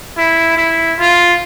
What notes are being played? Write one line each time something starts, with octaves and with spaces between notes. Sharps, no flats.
E4
E4
F4